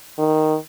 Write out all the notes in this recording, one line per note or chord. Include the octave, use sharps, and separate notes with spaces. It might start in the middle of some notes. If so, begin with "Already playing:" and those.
D#3